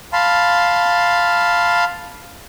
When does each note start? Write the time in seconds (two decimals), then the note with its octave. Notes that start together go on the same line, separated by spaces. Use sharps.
0.13 F5 A5 B5 C6